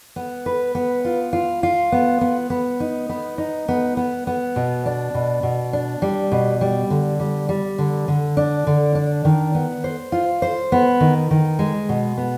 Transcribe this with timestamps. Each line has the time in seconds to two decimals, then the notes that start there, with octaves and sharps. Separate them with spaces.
0.16 B3
0.46 B4
0.75 B3
1.05 F4
1.33 F4
1.63 F4
1.92 B3
2.21 B3
2.50 B3
2.80 D#4
3.09 B3
3.38 D#4
3.68 B3
3.97 B3
4.27 B3
4.56 B2
4.86 D4
5.14 B2
5.43 B2
5.73 D4
6.02 G3
6.32 B2
6.61 G3
6.90 D3
7.20 G3
7.49 G3
7.78 D3
8.08 D3
8.37 D4
8.67 D3
8.95 D4
9.25 D#3
9.55 B3
9.84 C5
10.12 F4
10.42 C5
10.72 B3
11.00 D#3
11.31 D#3
11.59 G#3
11.89 B2
12.17 B3